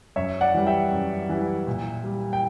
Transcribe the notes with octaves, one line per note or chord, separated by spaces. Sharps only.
F#2 C#5 E5
D5 F#5
E3 G3
E5 G5
F#2
E3 G3
A#2
G3
G5